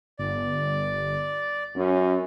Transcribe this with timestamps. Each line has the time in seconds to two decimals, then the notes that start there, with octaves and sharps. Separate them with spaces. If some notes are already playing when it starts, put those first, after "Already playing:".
0.19 G1 D5
1.76 F#2 C#4